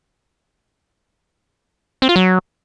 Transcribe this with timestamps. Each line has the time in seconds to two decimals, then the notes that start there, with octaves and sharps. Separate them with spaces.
2.02 C4
2.09 F4
2.16 F#3